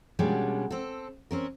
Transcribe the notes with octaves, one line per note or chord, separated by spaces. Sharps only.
B2 G3 G#3 A#3 C#4 D4
C4 A4
C4 C#4 A#4